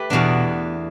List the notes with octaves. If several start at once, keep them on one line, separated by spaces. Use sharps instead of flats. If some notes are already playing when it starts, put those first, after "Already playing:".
Already playing: A3 G4 B4
E2 B2 B3 D4